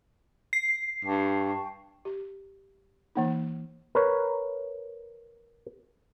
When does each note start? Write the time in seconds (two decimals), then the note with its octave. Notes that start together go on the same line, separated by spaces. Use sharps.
0.53 C7
1.05 G2 G5 A5 C#6
2.05 G4
3.15 E3 A#3 D#4
3.95 A#4 B4 C#5